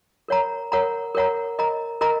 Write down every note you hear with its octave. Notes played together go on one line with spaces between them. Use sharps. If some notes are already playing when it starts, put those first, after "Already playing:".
A#4 C#5 F#5 A#5
A#4 C#5 F#5 A#5
A#4 C#5 F#5 A#5
A#4 D#5 A#5
A#4 D#5 A#5